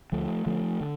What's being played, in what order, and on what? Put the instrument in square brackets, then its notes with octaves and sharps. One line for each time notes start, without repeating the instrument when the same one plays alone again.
[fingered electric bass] D2 F3 A3
D3 F3 A3
D3